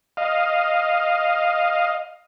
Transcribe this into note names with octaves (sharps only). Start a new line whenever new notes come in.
D#5 F5